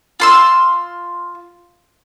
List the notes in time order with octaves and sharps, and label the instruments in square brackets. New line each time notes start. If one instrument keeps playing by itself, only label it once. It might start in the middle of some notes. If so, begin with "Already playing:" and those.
[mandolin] F4 C6 E6